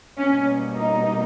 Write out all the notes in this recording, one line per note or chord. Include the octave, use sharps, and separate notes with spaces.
B2 G3 A#3 C#4
D#4